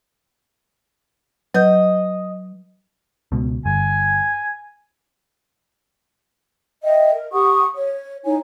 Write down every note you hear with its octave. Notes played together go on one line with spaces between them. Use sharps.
F#3 B4 D#5 G6
C#2 B2
G1 G#5
D#5 E5 G5
A#4
G4 F#5 C#6 D#6
C#5
D#4 E4 C#5 G#5